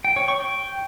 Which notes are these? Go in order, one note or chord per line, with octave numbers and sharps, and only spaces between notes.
G5
C#5
C#6
G5